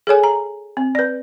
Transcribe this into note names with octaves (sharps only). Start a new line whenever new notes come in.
G#4 A4 C#5 G#5
A#5
C4
B4 D5